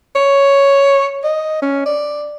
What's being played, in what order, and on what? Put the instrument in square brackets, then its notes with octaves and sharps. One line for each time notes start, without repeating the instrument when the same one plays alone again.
[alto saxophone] C#5
D#5
C#4
D5